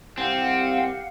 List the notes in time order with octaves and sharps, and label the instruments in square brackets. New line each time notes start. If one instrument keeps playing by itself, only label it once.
[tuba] C2 [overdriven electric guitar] C4 [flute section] G4 F5 F#5